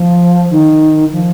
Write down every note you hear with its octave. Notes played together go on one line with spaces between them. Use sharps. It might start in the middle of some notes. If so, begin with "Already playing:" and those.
Already playing: F3
D#3
F3